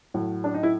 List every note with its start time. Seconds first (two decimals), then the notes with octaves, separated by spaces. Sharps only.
0.14 A2 F#3
0.44 D4
0.54 D#4
0.63 E4